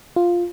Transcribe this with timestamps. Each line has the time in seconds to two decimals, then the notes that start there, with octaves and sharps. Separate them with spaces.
0.16 F4